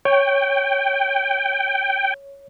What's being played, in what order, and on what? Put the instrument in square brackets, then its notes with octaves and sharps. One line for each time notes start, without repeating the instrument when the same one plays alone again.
[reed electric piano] C#5 [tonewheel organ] G5